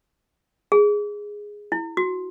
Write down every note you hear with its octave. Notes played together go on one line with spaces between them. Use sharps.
G#4
E4
F#4